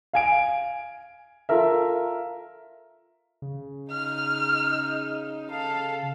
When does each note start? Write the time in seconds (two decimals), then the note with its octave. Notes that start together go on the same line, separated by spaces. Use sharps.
0.13 F5 G#5 D7
1.49 F4 A4 A#4 E5
3.42 C#3
3.91 D#4 F6
5.51 A4 F5